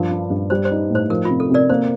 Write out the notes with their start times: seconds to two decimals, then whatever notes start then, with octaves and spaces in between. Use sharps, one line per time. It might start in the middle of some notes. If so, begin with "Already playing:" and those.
Already playing: G2 F3 A#4
0.11 D4
0.30 G2
0.50 G3 C5
0.65 C5
0.71 D#4
0.90 A2 C5
1.10 F3 A#4
1.25 C3 F4
1.40 A4
1.50 C3 A#4 D5
1.70 A#3 C5